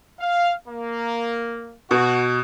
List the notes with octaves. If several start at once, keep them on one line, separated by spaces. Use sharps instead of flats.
F5
A#3
B2 F#4